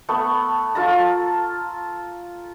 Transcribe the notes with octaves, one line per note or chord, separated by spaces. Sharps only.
A3 B3 C#6
F4 A4 A5 A#5